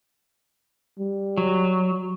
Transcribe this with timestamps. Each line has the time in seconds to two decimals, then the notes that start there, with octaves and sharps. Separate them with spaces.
0.99 G3
1.37 F#3